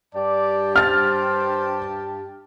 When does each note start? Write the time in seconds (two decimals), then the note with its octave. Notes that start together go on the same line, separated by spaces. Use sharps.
0.15 G2 G4 D5 A5
0.76 C5 F6 A6